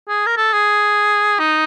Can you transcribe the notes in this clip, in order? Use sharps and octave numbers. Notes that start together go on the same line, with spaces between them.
G#4
A#4
A4
G#4
D#4